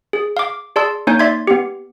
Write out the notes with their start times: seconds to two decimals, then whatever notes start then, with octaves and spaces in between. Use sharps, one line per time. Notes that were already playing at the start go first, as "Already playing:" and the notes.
0.13 G#4
0.37 F5 D6
0.76 G#4 D5 A5 C6 E6
1.07 A#3 D#4 C#5 G#5 G6
1.19 D5 E5 C6 G#6
1.47 B3 G4